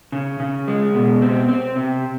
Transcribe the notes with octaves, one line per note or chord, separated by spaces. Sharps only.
C#3
C#3
G#3
B2
C4
C4
C3